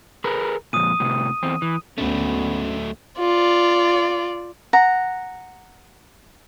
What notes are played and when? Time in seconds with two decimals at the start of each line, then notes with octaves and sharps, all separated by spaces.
0.24 G#4 A#4 B4
0.73 F2 A#2 D#6 D#7
1.00 A2 C3
1.43 E2 C4
1.62 E3
1.98 D2 G#2 F#3 A3 B3 C#4
3.19 F4 D5
4.73 F#5 A#5